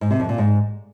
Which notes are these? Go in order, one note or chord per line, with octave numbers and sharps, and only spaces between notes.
G#2
C3
F2
A#2
G#2